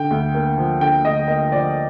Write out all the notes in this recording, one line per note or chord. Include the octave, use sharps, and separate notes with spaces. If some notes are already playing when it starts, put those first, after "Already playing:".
Already playing: D3 G5
D2
A#3
F3
D3 G5
D2 D#5
A#3 D#5
F3 D5